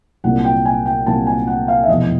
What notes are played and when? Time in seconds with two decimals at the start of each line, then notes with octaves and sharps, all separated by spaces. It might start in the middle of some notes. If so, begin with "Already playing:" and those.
0.24 C2 A#2 F#3 A#3 F#5
0.45 G5
0.65 G#5
0.86 G5
1.06 C2 A#2 F#3 A#3 A5
1.27 G#5
1.47 F#5
1.68 F5
1.83 E5
1.88 F1 E2 B2 D#5